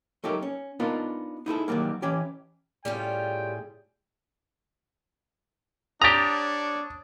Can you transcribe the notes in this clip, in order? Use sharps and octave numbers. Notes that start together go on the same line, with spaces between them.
F#3 A3 D#4 G4 A#4
C#4
B3 D4 D#4 F4 A#4
D#4 E4 G#4 A4
D#3 E3 F#3 G3 A#3
E3 C#4 G4
A2 G3 C#4 F4 G#4 G5
D4 G4 C#5 A#5 C#6 D#6 A6